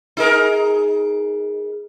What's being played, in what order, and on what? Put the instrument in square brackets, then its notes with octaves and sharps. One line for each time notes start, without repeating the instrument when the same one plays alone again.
[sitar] D#4 G#4 A#4